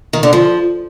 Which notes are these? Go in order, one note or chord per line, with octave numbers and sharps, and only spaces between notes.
D#3
D3
F3